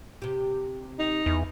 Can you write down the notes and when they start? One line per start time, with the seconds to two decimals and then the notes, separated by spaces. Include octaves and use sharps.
0.22 C3 G4
0.99 D#4
1.26 E2